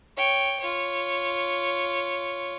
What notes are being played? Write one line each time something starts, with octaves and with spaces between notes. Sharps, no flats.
C#5 G5
F4 C#5